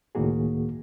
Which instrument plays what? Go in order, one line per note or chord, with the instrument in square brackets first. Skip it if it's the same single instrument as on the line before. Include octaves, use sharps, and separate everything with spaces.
[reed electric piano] C#2 A2 D#3 A#3 F#4 G#4